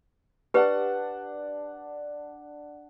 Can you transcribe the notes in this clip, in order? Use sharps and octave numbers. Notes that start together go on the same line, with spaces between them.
D4 G4 B4 F#5 A5